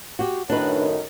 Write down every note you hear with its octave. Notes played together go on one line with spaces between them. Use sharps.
F#4 G4
F#2 A2 D#3 D4 D#4 B4